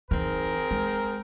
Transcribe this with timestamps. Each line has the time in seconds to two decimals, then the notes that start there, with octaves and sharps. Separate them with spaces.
0.11 E3 C4 D#4 G#4 A#4
0.71 G#3